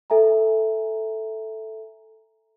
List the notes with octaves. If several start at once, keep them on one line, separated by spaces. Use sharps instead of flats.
A4 E5 G#5 A#5